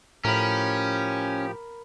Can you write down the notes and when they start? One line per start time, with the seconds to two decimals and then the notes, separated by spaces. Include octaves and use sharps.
0.25 A2 F3 C#4 G4 A#4 B5